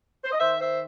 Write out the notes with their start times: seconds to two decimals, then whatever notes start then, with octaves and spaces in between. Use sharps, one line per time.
0.24 C5
0.32 D#5
0.39 D#3 C5 E5
0.58 C5 E5